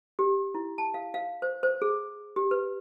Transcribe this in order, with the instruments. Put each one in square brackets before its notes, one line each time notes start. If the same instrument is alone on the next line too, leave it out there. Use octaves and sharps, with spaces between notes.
[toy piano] G4
E4
A5
F5
F5
C5
C5
G#4
G4
B4